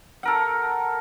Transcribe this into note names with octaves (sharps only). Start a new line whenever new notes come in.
A4 A#4 F#5